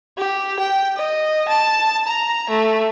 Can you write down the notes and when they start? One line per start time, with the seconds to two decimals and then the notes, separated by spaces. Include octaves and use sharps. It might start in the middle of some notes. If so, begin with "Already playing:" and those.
0.18 G4
0.60 G5
0.96 D#5
1.48 A5
2.08 A#5
2.50 A3